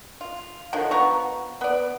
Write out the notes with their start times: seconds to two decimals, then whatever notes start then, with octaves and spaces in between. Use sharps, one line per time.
0.21 F4
0.73 D3 D#3 F3 F#3
0.91 F3 B3 A#5 C#6
1.61 B3 D5